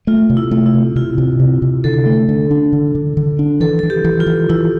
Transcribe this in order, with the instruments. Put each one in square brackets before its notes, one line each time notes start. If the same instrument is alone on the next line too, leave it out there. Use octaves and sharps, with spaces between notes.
[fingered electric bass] A3 [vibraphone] F4
[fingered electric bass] C3
[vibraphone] E4
[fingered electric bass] A3
[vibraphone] E4
[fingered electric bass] C3
[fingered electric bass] C3 [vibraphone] F4
[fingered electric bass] C3
C3
C3
[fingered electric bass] D3 [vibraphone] A4
[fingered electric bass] A3
D3
D4
D3
D3
D3
D4
[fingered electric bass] E3 [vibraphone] A4
[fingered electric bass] E3 [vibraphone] A4
[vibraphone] G4
[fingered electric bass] E3
[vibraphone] F4
[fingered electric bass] E3
[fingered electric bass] E3 [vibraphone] E4